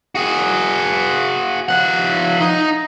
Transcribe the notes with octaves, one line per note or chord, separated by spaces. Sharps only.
F#4 G#4
F3 F#5
D#4